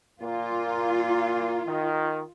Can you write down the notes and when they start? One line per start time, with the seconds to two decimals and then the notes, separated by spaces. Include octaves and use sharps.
0.22 A#2 A#3 F4
1.67 D#3